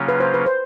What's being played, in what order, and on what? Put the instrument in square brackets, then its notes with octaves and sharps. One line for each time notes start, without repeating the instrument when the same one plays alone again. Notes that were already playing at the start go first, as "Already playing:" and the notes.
Already playing: [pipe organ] C#3 F#3 A#3 C#4 F4
[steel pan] B4
C5
B4
C5